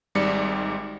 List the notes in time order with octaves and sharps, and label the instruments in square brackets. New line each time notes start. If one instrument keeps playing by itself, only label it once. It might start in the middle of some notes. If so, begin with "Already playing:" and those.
[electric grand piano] G#1 G#2 G3 D5 C#7